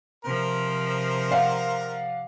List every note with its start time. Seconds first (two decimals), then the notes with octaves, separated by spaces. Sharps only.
0.25 C3 F3 A#4 C5
1.31 D5 F5 F#5